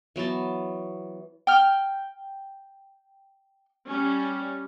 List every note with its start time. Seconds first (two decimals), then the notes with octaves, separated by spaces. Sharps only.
0.16 E3 F#3 B3 A5
1.47 G5 F6
3.86 G3 C#4